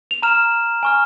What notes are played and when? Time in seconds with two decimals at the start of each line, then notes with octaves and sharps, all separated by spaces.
0.11 F7
0.22 A#5 F6 E7
0.83 G#5 C#6 F6